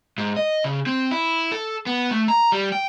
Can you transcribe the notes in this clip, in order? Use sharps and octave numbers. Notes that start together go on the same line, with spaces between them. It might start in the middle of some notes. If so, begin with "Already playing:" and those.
G#2
D#5
C#3
C4
E4
A4
B3
A3
A#5
G3
G5